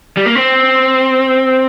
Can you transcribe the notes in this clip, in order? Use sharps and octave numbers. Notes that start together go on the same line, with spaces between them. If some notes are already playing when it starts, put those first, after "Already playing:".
G3
A#3
C4